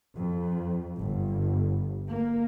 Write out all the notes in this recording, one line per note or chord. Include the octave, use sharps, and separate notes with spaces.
F2
G1
A#3